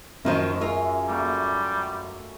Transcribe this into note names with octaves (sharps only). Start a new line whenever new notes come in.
F#2 D#3 F3 A#3 A#4 C#5 D#5
F4 G#4 A#4 E5
G3 A3 A#3 F#4